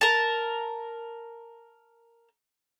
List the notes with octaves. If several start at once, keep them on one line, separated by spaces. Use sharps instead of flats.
A#4 A5